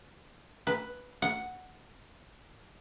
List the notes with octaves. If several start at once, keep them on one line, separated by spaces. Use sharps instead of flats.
B4
F#5